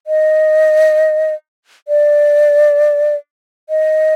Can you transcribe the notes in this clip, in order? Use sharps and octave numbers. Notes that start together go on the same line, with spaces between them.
D#5
D5
D#5